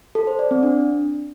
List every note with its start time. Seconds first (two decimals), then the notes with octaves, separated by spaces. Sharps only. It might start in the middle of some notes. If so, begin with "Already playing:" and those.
0.15 A4
0.27 C5
0.39 D5
0.51 C4
0.63 D4